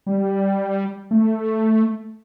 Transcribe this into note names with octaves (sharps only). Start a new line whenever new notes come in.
G3
A3